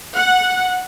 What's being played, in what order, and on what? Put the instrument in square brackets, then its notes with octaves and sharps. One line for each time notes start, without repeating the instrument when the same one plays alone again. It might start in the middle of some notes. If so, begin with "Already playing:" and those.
[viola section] F#5